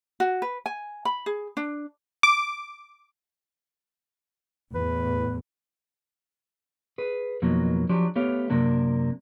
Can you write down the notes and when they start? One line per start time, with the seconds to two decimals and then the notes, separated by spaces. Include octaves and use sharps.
0.20 F#4
0.42 B4
0.66 G#5
1.05 B5
1.26 G#4
1.57 D4
2.23 D6
4.75 E2 A2 B4
6.98 G#4 B4
7.42 F2 B2 D#3 F#3 A#3
7.89 F3 F#3 D4 G4
8.16 A3 B3 G4 C#5 F5
8.50 F#2 C3 A#3 D4